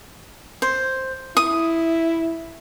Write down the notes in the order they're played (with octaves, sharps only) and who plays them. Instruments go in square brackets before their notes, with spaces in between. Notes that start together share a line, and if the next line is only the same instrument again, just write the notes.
[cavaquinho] C5
[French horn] E4 [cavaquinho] D#6